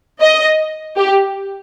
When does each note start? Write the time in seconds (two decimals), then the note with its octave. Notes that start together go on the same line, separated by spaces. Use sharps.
0.20 D#5
0.97 G4